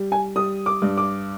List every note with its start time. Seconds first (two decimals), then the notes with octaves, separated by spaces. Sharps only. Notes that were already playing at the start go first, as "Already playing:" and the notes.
Already playing: G3
0.12 G#5
0.36 G3 D#6
0.66 D6
0.82 G2
0.98 D6